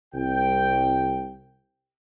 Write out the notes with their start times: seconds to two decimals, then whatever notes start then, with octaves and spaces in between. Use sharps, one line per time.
0.14 C2 G5